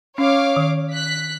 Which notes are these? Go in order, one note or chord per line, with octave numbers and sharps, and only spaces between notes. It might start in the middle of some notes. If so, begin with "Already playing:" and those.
C#4 C#5 F5 D6
D#3
F#6 B6